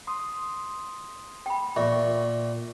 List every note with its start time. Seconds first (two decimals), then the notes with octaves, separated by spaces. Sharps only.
0.07 C6 D#6
1.46 G5 B5
1.76 A#2 E5 C#6 A#6